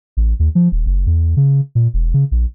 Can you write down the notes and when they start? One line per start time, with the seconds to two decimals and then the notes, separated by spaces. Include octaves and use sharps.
0.17 A1
0.39 D#2
0.55 F3
0.72 D#1
0.86 F#1
1.06 E2
1.37 C#3
1.75 A#2
1.94 E1
2.14 C#3
2.31 A#1